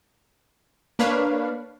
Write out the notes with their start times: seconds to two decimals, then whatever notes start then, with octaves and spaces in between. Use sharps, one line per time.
0.99 A#3 D4 B4 C#5 F5